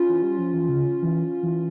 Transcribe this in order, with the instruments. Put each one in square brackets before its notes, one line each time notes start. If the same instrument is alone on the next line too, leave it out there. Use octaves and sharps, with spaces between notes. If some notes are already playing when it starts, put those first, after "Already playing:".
Already playing: [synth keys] C#4 F4
[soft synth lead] E3
G3
F3
E3
C#3
E3
E3